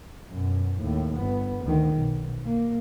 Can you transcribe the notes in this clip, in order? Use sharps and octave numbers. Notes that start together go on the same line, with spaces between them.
F#2 B2
D#2 A2
G1 B3
D2 D#3
B1
A#3